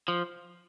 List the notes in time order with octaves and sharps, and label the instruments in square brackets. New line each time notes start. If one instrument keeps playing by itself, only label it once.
[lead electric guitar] F3